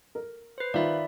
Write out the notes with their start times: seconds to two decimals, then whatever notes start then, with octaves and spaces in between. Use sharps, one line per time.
0.15 A#4
0.58 B4 C5
0.74 D#3 F4 D5 E5 B5